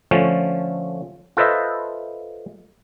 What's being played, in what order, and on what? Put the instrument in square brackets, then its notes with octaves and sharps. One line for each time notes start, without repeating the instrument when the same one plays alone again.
[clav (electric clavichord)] D3 F3 A3 C#4
F4 A4 B4 C5 D#5 E5